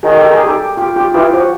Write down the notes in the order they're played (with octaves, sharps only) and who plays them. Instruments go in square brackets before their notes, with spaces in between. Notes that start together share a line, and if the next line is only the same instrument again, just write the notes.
[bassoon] D#3 [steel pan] F#4 G#4
[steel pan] G4 A4
G#4 A#4
G4 A4
F4 G4
F4 G4
[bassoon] E3 [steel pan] F4 G4
[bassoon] F3 [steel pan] F#4